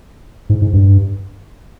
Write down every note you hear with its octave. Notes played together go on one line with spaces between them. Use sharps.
G#2
G#2
G2